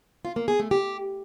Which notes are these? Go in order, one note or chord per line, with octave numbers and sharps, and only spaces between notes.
F4
A#3
G#4
A3
G4